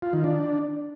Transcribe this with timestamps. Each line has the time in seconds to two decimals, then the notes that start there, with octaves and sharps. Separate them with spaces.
0.02 F4
0.13 D#3
0.24 D4